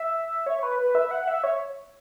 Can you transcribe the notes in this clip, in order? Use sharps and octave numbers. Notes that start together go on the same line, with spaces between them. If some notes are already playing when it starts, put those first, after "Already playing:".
Already playing: E5
C#5
C#5
B4
B4
E5
F#5
F#5
E5
C#5